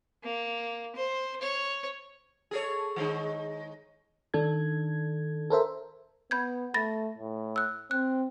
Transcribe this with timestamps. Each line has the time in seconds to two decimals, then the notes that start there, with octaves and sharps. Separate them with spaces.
0.23 A#3
0.95 C5
1.41 C#5
2.51 G#4 A4 C#5
2.96 D#3 G#3 D#4
4.34 D#3 D4 A4 G#6
5.50 A4 A#4 C5 E5
6.31 B3 B5 G6 G#6
6.74 A3 B5 A6 A#6
7.18 A2
7.56 E6 F#6
7.91 C4 F#6